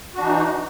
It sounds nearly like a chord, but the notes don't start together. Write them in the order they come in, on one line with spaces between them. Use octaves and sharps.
F#4 D4 E3 D#4